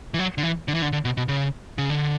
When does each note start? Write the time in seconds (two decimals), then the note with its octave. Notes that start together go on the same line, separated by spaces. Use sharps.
0.14 E3
0.19 F#3
0.38 D3
0.43 E3
0.68 D3
0.75 E3
0.82 D3
0.93 D3
1.05 B2
1.17 B2
1.28 C#3
1.78 C#3
1.90 D3